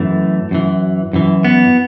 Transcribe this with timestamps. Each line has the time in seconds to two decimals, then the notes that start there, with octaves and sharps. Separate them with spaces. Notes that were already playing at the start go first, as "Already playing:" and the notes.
Already playing: F#2 E3 A3
0.51 F#2 E3
1.13 F#2 E3
1.45 B3